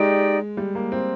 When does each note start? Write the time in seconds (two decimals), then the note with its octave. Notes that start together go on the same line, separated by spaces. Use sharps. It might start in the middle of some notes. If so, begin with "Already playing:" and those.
Already playing: G#3 D#4 G4 D5 G5
0.57 G3
0.75 A#3
0.92 C4